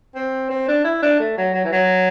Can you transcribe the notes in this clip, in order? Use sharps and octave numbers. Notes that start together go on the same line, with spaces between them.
C4
C4
D4
E4
D4
A3
F#3
F#3
E3
F#3